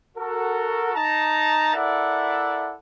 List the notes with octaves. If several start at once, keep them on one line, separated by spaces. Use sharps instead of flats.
F#4 A4 A#4
D#4 A5 A#5
E4 A4 A#4 D5 E5 F#5